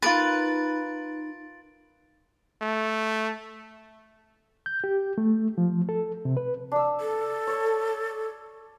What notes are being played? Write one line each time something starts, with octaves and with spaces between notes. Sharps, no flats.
D#4 F4 G#4 A#4 B4 A6 D7
A3
G6
G4
A3
F3
A4
C3
B4
D4 E6
A4
C#5